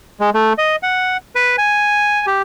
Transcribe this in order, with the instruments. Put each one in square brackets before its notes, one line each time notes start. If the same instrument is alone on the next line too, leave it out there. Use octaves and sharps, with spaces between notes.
[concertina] G#3
A3
D#5
F#5
B4
G#5
G4